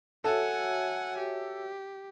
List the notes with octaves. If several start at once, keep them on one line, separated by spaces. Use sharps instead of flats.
F#4 A4 C#5 E5 F#5 G#5
G4